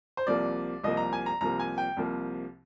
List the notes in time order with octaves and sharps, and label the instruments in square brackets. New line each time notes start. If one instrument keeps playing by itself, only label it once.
[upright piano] C5
C2 C3 F3 A#3 D5
C2 C3 F3 A#3 D#5
A#5
G#5
A#5
C2 C3 F3 A#3 A#5
G#5
G5
C2 C3 F3 A#3